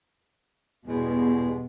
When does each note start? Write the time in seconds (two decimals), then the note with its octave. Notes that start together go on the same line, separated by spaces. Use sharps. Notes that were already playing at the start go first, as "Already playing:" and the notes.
0.87 E2 G2 B2 G#3